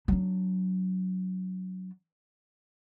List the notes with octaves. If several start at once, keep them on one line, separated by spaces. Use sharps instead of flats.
F#3 D4